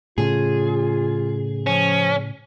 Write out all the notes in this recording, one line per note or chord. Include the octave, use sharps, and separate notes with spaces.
A2 C#3 F4 G#4
F3 C#4